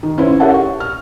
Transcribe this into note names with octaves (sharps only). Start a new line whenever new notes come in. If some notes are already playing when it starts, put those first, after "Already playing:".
D#3
C#4 E4 B4 C5
G4 A#4 C#5 E5 F#5 A5
C#6
F6